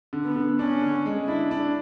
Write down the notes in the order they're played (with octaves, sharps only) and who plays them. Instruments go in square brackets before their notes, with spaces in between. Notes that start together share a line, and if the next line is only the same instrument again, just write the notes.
[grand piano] D3
[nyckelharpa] B3
[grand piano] D3
[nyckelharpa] C#4 [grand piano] D4
[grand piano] D3
G#3
[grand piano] D4 [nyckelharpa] E4
[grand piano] D4